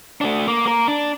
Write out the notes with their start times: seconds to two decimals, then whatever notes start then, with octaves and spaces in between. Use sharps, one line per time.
0.21 A3 D4
0.48 A#3
0.66 A#3 A#4
0.88 D4